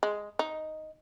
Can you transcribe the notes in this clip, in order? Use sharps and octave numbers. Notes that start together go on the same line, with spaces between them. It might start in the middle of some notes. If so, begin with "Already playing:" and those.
G#3
D#4